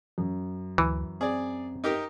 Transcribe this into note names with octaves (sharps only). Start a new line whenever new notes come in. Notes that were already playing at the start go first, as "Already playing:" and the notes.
F#2
D2 E3
C4 G#4 D5
D#4 G4 A#4